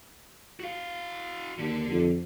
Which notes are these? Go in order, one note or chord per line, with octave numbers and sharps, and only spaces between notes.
F#4 F5
D#2 D3
F2